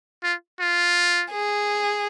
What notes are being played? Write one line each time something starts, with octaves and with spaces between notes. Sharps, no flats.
F4
F4
G#4